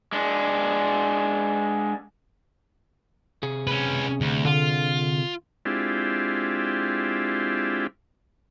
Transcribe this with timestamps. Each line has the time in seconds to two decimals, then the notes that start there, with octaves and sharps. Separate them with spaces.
0.12 G#3 D4
3.43 C3 G#4
3.67 C#4 B4
4.21 D2
4.45 D3 F4
5.65 G#3 C4 D4 E4 F4 G4